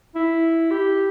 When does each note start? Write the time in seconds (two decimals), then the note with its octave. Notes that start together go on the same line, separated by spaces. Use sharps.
0.15 E4
0.71 G4